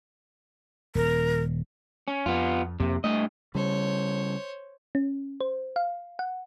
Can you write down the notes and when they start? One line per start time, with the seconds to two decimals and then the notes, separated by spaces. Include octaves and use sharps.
0.95 D#1 A#4
2.08 C#4
2.26 F2 B3 F4
2.80 F2 C3 A#3
3.04 G2 A3 D#5
3.55 C#3 G3 C5 C#5
4.95 C#4
5.41 C5
5.76 F5
6.19 F#5